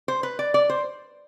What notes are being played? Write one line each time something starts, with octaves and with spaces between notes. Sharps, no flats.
C5
B4
D5
D5
C5